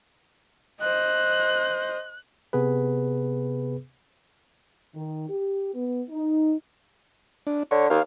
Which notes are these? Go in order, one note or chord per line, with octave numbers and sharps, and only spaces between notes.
C5 D#5 F#6
C3 B3 G#4 B4
D#3
G4
B3
D#4
D4
D3 C#5
D#2 F5